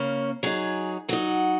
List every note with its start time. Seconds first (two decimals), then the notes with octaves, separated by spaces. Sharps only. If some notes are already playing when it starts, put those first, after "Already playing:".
Already playing: C#3 A#3 C#4
0.43 F#3 D#4 G#4
1.09 F#3 D#4 F#4